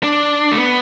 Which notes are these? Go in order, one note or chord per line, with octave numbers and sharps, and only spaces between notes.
D4
A3
B3